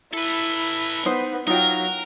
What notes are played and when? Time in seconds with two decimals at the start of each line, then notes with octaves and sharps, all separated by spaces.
0.13 E4 A4 B4
1.06 B3 D#4 C5
1.47 F#3 D#4 F4 A#4 G5